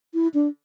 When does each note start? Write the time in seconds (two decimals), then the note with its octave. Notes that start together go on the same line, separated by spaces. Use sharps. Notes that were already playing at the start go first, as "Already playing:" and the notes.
0.14 E4
0.34 D4